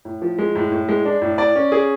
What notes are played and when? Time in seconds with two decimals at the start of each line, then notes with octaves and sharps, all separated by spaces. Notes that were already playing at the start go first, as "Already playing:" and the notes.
0.05 A2
0.22 F3
0.38 G#3
0.55 A2
0.72 A2
0.89 G#3
1.05 D4
1.22 A2
1.38 D5
1.55 C#4
1.72 G#4